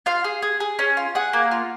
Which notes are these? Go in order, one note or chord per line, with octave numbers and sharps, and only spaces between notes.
F4 F5
G#4
G#4
G#4
C#4
F4
G#4 F#5
A#3
F4